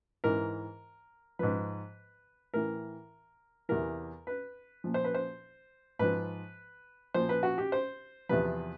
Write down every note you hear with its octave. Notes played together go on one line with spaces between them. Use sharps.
G#2 E3 A#4
G#2 F3 B4
A2 E3 A#4
E2 C3 E3 A#4
B4
A#2 F3
C5
B4
C5
G#2 F3 B4
A#2 F3 C5
B4
F#4
G4
C5
E2 C3 F3 B4